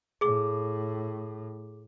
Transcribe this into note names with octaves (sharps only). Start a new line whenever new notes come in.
A2 G#4 D6